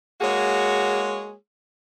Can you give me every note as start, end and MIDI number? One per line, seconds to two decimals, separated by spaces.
0.21 1.33 56
0.21 1.33 58
0.21 1.33 66
0.21 1.33 68
0.21 1.33 73